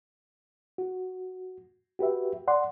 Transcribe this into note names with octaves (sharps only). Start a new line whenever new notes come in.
F#4
F#4 G4 B4 E5
D5 F#5 C6